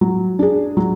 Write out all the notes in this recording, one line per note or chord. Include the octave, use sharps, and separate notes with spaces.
F#3
D4 G#4
F#3